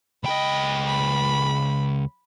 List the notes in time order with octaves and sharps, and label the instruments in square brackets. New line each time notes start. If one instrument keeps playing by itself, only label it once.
[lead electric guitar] C#2 G5 [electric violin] D#5 B5
[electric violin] B5